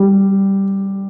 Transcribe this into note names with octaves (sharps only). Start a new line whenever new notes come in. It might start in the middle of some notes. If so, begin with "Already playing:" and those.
Already playing: G3